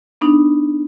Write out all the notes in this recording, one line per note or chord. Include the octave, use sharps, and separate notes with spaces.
B3 D4 D#4